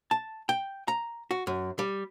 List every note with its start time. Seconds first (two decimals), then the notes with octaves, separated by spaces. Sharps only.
0.11 A5
0.49 G5
0.88 A#5
1.31 F#4
1.47 F#2
1.79 G3